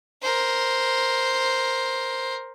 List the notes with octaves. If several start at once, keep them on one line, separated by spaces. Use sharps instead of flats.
A#4 C5